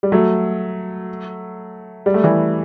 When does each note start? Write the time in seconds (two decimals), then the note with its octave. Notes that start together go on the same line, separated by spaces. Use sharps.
0.03 G3
0.12 F#3 A3
2.06 G3
2.14 A3
2.23 E3 G3